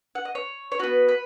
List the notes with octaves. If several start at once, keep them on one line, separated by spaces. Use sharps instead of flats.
F#5
D#5
C#5
C#5
B3 F#4 B4
B4